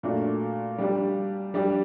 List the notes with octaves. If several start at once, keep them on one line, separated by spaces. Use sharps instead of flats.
A#2 A3 D4 F#4
G3 D4 G4
G3 D4 G4